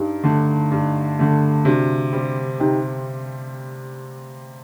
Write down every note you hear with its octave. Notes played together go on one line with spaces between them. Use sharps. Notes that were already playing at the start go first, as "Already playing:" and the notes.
Already playing: G2 D#4 G4
D3 A3
G2
D3 A3
C3 D4 F#4
G3 C4
C3 D#4 G4